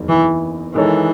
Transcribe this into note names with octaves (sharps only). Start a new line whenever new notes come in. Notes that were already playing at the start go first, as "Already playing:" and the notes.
Already playing: F#1 E2 D#3 F#3
E3
D#3 E3 G#3 D#4 A4 C#5